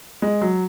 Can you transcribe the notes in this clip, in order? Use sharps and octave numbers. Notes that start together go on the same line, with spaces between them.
G#3
F#3